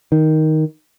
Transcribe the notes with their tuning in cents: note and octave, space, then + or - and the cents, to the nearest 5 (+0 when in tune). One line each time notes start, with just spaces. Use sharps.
D#3 +5